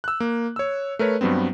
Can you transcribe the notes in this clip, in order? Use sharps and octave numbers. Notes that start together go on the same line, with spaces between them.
E6 F#6
A#3
C#5 E6
A3 A#4 B4 C#5
G2 F#3 G3 B3 C4